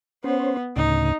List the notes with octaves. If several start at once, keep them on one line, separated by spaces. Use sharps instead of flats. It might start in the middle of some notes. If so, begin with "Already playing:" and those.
B3 C#4 C5
D2 A2 C#3 D#4